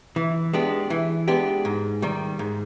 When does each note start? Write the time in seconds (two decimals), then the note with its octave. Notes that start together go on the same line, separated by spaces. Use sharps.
0.16 E3
0.53 G#3 B3 D4 G4
0.90 E3
1.28 G#3 B3 D4 G4
1.65 G#2
2.02 D#3 G3
2.39 G#2